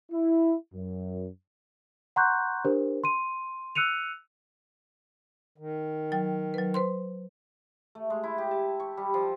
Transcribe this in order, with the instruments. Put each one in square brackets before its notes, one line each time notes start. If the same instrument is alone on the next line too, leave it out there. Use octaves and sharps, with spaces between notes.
[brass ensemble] E4
F#2
[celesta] F#5 A#5 C6 C#6 F#6 G6
D4 G4 A#4 C5
C6 D#7
E6 F#6 C#7 D#7 F7
[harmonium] D#3
[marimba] F#3 G5
F#3 B4
B4 C5 C6
[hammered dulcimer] A3
G#3
E4
G4
A5
C#6
G3
F3